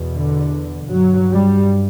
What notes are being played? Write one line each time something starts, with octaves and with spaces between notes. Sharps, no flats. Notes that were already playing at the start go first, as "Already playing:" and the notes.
Already playing: E2 B2
D3
G2 F#3
G3